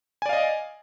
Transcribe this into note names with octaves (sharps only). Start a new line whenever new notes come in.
D5 D#5 F5 G#5